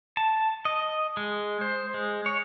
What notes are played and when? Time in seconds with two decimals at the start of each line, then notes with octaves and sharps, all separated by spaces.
0.17 A5
0.65 D#5
1.17 G#3
1.61 C5
1.94 G#3
2.26 C#5